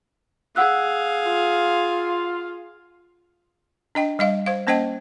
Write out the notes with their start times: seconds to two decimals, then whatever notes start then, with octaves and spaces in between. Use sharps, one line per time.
0.56 G#4 F5 F#5 E6 F#6
1.25 F4
3.95 D4 D#5 G5
4.19 G3 D#5 F5
4.46 C5 F5
4.67 A#3 C#4 C5 D#5 G5 A5